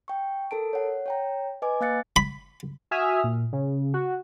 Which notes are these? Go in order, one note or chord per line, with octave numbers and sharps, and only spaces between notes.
G5 C#6
A4 A#4 A5 D7
C#5 F#5
C#5 G5 A#5
B4 D#5 G#5 D6
A#3 F5 F#6 A6 C#7
B5
F#4 E5 G#5 D#6 F6
A#2
C#3
F#4